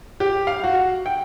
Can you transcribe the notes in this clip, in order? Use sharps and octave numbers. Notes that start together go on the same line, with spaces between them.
G4
F5
F#4
G5